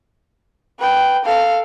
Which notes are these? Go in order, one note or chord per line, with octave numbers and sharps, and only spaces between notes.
B4 G5
A4 F5